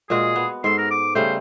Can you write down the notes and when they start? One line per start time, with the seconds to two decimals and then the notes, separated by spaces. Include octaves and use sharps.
0.10 A#2 G#3 F#4 G#4
0.36 B3
0.64 G#2 A4 C6
0.78 A#4
0.91 D6
1.15 C#3 G3 A3 C5